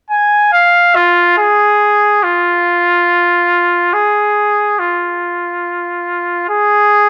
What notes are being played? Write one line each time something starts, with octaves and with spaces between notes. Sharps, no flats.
G#5
F5
F4
G#4
F4
G#4
F4
G#4